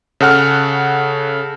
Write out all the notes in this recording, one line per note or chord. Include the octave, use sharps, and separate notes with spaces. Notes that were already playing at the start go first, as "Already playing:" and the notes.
C#3 A4 F#5 F6